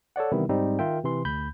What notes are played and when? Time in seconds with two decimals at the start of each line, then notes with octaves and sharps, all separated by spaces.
0.16 A4 C#5 D5 F#5
0.32 C3 D#3 E3 G3 B3 E4
0.49 G#2 G3 C4 D#4
0.79 D#3 F4 A#4 E5 G5
1.04 C3 E3 C6
1.25 D2 B5 G6